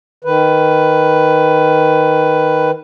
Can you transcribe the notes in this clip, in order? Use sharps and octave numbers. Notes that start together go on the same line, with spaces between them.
D#3 B4